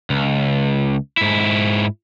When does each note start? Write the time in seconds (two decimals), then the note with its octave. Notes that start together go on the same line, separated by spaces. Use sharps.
0.10 C#2
1.17 G#2 E4